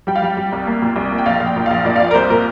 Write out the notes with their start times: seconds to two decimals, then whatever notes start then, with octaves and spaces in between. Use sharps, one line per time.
0.07 G3 G5
0.16 F5
0.22 G3 G5
0.37 G3
0.52 C2
0.67 A#3
0.82 A#2
0.96 C2
1.12 A#3
1.18 G5
1.26 A#1 F5
1.40 A#1
1.46 G5
1.56 A#2
1.66 A#1 F5
1.85 A#2 D5
1.96 F5
2.00 F3 D5
2.11 A#4
2.14 C2 C5
2.30 A#2 A#4